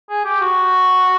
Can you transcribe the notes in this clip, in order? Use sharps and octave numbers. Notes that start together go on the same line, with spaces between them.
G#4
G4
F#4